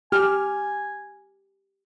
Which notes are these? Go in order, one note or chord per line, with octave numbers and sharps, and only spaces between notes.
G4 G#5 F6